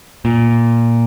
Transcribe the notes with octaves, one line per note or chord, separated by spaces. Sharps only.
A#2